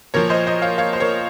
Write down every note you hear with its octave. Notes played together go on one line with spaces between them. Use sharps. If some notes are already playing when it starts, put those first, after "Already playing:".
A#2 F3 A#4 C#5
C5 D#5
C5 D#5
C#5 F5
C#5 F5
C5
A#4 C#5